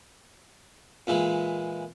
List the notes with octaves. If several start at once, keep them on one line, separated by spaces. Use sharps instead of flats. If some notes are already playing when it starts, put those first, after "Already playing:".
A#2 E3 G#3